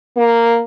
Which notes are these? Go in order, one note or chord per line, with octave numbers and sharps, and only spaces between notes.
A#3